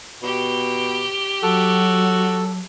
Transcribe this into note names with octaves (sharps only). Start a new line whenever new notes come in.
B2 G4 G5
F#3 F#4 A4